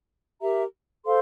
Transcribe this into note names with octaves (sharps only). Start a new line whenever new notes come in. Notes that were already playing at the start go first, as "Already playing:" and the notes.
G4 A#4 E5 A#5
A4 C5 F5 C6